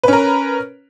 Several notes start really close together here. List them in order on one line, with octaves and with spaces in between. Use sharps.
B4 C#4 A#4